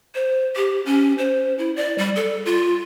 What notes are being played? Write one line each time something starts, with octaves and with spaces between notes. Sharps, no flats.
C5
G4
C#4
C5
E4
D5
G3
A4
F4